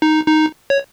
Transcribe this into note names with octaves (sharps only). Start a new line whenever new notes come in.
D#4
D#4
C#5